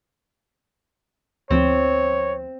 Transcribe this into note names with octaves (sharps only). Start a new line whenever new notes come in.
D2 F3 C4 C#5